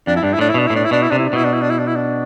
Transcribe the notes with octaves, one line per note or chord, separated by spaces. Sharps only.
F2 D4
E4
G2 D4
E4
A2 D4
E4
B2 D4
A2 E4
D4
E4
B2 D4
E4
C3 D4
E4
D4
B2 E4
D4
E4
D4
E4
D4
E4
D4